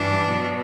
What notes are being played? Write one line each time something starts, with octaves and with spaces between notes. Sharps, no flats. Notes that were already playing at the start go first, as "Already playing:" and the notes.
Already playing: G2 E3 G3 D4
B2 F#3 B3